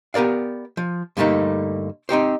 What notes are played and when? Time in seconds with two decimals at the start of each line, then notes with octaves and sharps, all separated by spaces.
0.14 B3 G4 A#4 D5 F5
0.77 F3
1.17 G2 D3 G3 A3 A#3 D#4
2.09 C4 D#4 G4 C5